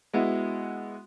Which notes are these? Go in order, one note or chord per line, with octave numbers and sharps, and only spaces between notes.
G#3 B3 E4 F#4